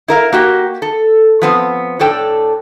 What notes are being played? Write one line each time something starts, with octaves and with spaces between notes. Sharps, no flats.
E4 A#4 F5
A#3 F#4 G4
A4
F3 B3 C4
A2 D4 A4 G5